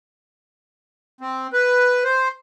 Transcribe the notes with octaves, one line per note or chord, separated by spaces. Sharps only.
C4
B4
C5